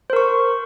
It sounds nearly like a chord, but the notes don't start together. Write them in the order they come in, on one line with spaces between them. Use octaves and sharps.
C5 A#4 C#6